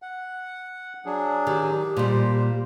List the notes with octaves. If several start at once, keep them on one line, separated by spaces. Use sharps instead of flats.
F#5
F#3 D4 G#4
D#3 G4
A#2 G3 C5